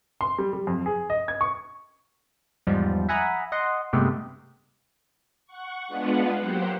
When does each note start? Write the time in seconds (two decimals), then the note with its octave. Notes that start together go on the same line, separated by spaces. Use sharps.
0.21 C6
0.38 G3
0.53 G3
0.67 F2
0.86 G#4
1.10 D#5
1.28 G#6
1.41 C#6
2.67 E2 G#2 F3 G3
3.09 E5 F#5 G#5 A#5 B5 D#6
3.52 D#5 F#5 C6
3.93 G2 C3 G#3 A3 B3 G4
5.46 F#5 C#6
5.88 G#3 B3 D4 F4 B4 F#5
6.39 F#3 A#3 G4 C5 F#5 G5